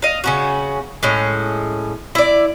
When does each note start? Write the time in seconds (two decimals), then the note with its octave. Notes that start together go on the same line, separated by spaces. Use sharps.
0.02 D#5 F5
0.24 C#3 C#4 F#4
1.03 A2 G#3 C#4
2.15 E4 D5